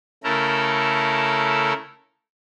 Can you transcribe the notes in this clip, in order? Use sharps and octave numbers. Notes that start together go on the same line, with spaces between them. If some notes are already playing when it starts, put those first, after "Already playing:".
C#3 A3 E4 A4 A#4